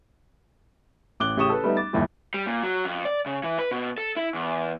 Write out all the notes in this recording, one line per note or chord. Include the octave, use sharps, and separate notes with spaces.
A1 D6 F#6 G7
A1 C#3 G4 C#6 D#6 E7
A4 B4
G3 A3 B3 D#4
D6 A6
G1 D#2 E3 G3 A3 G4
G3
A#2
F#3
F2
D5
C#3
E3
B4
B2
A4
E4
E2